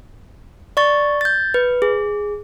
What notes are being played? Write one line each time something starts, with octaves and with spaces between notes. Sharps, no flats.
D5 C#6 A6
G6 A6
B4
G#4